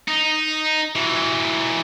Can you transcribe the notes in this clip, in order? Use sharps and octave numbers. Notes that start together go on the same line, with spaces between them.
D#4
E3 F#3